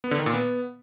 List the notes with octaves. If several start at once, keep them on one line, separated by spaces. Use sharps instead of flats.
B3
D3
D#3
A#2
B3